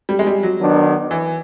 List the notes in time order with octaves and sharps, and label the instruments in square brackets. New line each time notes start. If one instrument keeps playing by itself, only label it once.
[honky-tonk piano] G3
G#3
G3
F#3
[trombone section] D#3 F#3 B3 D4
[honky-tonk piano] E3